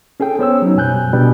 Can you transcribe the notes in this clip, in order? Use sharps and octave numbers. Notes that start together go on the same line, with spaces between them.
C#4 G#4 A4 G5
B3 C#4 C5 C#5 E6
F#3 D#4
F#2 B2 G3 G#5 F#6 G6
B2 G3 B3 D4